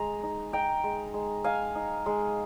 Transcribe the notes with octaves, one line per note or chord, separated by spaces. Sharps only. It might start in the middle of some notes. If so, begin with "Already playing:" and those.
Already playing: G#3 A#5
D#4
D#4 G5 A#5
G#3
G#3
D#4 F5 G#5
D#4
G#3